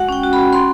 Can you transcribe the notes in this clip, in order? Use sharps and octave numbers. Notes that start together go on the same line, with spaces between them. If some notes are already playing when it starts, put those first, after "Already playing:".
Already playing: G#3 F#4 F#5
C#4 G5
F#4
B5
F#4
C#4 C6